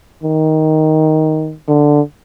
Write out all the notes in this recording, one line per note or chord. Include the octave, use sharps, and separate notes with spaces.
D#3
D3